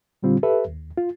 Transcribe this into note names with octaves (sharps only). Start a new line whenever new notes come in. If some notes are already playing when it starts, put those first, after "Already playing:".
A#2 D3 G3 C4 F4
G4 A4 B4 E5
D#2
F4